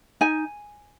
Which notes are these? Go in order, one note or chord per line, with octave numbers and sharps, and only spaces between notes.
D#4 G#5